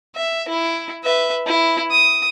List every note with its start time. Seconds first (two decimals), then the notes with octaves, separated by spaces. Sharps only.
0.16 E5
0.48 E4
1.04 B4 E5
1.47 E4
1.91 D#6